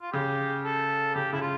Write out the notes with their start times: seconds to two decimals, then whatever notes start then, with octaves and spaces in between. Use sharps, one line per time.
0.02 F4
0.12 C#3 G4
0.64 A4
1.15 C#3 G4
1.33 C#3 E4
1.41 F4